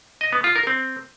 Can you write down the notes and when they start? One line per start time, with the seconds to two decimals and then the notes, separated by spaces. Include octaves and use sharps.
0.21 D#5
0.32 B3
0.44 F4
0.56 A#4
0.67 C4